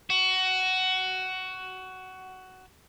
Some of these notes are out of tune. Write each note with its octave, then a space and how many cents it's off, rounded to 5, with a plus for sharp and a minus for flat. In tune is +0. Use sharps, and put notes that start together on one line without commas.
F#4 +15